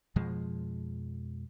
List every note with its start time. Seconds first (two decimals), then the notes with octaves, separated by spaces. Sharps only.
0.16 F2 B2 F3 G#3